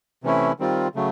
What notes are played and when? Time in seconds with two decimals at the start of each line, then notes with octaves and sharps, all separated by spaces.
0.24 C3 E3 A3 C#4 E4
0.59 D#3 G3 C4 F4
0.95 C#3 F#3 A3